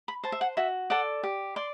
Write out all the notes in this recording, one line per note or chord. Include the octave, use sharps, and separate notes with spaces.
B5
C5 A5
E5
F#5
F#4 E5
A4 D5 F#5
G4
D5 C6